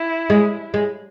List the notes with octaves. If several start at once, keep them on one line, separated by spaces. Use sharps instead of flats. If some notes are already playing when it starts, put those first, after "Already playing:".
Already playing: E4
G#3
G#3